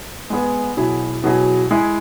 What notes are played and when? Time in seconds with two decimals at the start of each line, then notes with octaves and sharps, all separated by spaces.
0.30 G#3 B3 G#4
0.77 B2 F#3 E4 G#4
1.24 B2 F#3 E4 G#4
1.71 G#3 E4 G#4